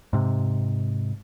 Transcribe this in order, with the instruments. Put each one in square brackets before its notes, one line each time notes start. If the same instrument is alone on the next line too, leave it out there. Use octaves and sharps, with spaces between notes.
[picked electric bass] G#2 C3